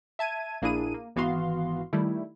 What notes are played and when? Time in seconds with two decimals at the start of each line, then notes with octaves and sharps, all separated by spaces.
0.19 E5 A5 G#6 D#7
0.62 A#1 A#3 D4 E4 G#4 D#7
0.94 A#3
1.16 G#1 E3 B3 F#4 F5 C6
1.93 D#3 G3 A3 E4